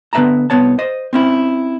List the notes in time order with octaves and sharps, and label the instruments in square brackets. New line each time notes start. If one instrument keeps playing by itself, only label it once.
[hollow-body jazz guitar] D3 B3 B4 E5 A5 A#5
C2 B3 C#5 A5
C5 D#5
C4 C#4 E4